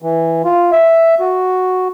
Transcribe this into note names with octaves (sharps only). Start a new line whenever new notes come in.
E3
F4
E5
F#4